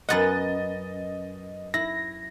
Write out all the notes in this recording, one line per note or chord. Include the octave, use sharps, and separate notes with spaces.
F#2 B3 D#5 F#5 A6
E4 A#6